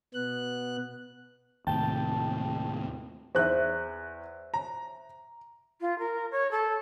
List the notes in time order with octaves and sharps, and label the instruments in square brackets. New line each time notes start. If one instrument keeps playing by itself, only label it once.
[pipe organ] B2 B3 F#6
[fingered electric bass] D#2 A2 C3 [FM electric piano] G5 A5
[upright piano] E2 F#6 [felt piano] C5 E5
[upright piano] A#5
[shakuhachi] F4
A#4
C#5
A4